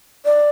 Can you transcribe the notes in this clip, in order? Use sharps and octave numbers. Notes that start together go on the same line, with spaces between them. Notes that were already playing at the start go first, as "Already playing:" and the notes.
D5